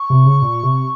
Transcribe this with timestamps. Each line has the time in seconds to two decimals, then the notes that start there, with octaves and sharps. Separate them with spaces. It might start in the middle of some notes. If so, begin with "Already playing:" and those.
Already playing: C#6
0.10 C3
0.26 C#3
0.42 A#2
0.63 C3